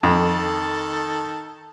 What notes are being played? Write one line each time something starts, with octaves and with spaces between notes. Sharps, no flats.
F2 D#3 A4 A5